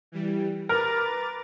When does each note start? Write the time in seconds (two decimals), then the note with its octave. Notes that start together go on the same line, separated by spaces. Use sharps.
0.12 E3 G3
0.69 A#4 B4 D6 A6